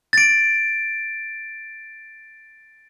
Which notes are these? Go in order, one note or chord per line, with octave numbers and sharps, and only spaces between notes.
A6 D7